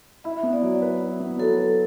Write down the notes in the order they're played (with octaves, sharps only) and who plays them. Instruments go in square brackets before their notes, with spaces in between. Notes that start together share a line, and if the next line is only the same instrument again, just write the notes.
[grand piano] E4 [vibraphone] E5
[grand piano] B3
[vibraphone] D5
[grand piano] F#3
B4
E4
B3
[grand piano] F#3 [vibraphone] A4
[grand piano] B4